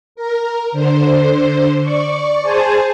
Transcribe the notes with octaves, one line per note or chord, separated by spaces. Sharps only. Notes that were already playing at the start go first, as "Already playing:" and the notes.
A#4
D3 C5
D5 C#6
G#4 C5 G#5 A5